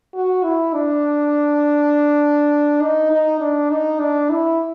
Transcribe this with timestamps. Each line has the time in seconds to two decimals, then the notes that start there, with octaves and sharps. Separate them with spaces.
0.14 F#4
0.44 E4
0.73 D4
2.82 D#4
3.11 D#4
3.40 D4
3.70 D#4
4.00 D4
4.30 E4